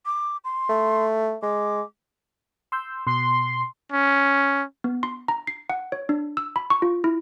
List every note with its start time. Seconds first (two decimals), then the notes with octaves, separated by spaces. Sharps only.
0.06 D6
0.44 C6
0.69 A3
1.42 G#3 D6
2.72 C6 E6 G6
3.07 B2 C6
3.92 C#4
4.84 B3
5.03 C6
5.28 A#5
5.47 C7
5.70 F#5
5.92 C#5
6.09 D4
6.37 E6
6.56 B5
6.70 C#6
6.82 F4
7.04 E4